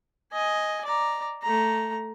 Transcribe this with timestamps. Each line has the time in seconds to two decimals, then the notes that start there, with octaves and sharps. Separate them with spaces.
0.33 D#5 G#5
0.85 D5 A#5
1.42 A3 A#5